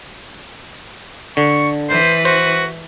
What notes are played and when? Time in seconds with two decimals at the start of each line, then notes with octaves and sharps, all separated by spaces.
1.37 D3 C#6
1.89 E3 B4 C5
2.25 F#4 C5